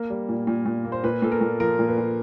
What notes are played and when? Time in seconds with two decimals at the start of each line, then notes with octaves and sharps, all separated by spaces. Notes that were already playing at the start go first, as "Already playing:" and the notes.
Already playing: A#3 A#4
0.10 G3
0.29 A#2
0.47 A#2
0.66 A#2
0.85 A#3
0.92 C5
1.04 A#2 B4
1.22 A#2 A4
1.32 A#4
1.41 A#2
1.60 F3 A#4
1.79 A#2
1.88 B4
1.98 A#2